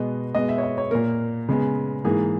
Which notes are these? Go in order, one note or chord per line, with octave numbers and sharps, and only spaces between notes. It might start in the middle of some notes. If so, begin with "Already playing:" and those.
Already playing: B2 G#3 B3 D#5
B2 G#3 B3 D#5
E5
C#5
D#5
C#5
A#2 A#3 A#4
C#3 G#3 B3
G#2 E3 A#3 G#4